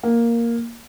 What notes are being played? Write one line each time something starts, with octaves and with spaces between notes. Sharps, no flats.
A#3